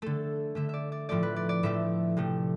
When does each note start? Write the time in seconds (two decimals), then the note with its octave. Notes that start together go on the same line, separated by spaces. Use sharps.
0.02 D3 A3 A4
0.55 D3 A3 E5
0.69 D5 E5
0.92 D5
1.09 A2 F3 A3 D5
1.23 B4
1.36 D5
1.49 D5
1.63 A2 F3 A3 E5
2.17 C3 F3 A3